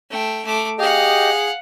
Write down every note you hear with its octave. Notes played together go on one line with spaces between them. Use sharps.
A3 G5
A3 D6
G4 G#4 D#5 F5 F#5